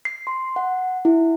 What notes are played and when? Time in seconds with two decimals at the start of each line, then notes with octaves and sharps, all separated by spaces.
0.05 C7
0.27 C6
0.56 F#5
1.05 E4